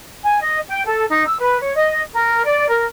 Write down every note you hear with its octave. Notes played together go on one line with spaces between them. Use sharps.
G#5
D#5
G5
A4
D#4
E6
B4
C#5
D#5
A#4
D5
A#4